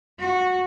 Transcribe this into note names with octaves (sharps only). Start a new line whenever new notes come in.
F#4